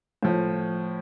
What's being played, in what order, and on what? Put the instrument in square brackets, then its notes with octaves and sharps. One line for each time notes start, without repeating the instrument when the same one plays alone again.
[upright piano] A2 F3